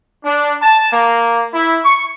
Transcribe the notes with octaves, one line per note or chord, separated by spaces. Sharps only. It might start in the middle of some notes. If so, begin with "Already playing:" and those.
D4
A5
A#3
E4
C#6